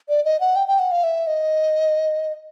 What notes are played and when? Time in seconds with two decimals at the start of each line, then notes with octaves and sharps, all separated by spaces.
0.09 D5
0.25 D#5
0.41 F#5
0.56 G5
0.68 G5
0.79 F#5
0.91 F5
1.04 E5
1.27 D#5